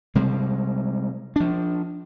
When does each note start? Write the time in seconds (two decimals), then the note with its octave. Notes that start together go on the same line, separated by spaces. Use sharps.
0.15 C3 G3 G#3
1.36 F3 D4